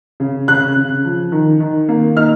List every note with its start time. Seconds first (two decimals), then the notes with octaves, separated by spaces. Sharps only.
0.20 C#3
0.48 C#3 F#6
0.76 C#3
1.04 F3
1.32 D#3
1.60 D#3
1.89 A#3
2.17 D#4 F6